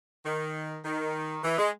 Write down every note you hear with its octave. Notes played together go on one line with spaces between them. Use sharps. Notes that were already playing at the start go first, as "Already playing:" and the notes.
D#3
D#3
E3
G#3